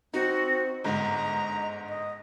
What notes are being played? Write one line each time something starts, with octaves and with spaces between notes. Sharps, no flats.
C4 D#4 F#4
G1 G#2 D#5 A#5
D#5